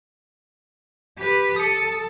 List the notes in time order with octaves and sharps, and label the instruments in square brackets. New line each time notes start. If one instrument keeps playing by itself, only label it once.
[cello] G4 B4
[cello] A4 [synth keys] D#6 C#7